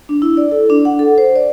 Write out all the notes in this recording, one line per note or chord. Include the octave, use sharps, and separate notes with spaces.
D4
E4
D5
A4
D4
F#5
A4
C5
D5